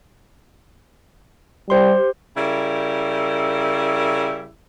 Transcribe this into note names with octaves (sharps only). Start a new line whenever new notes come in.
G3 G4 C5 C6
C#3 G3 E4 A#4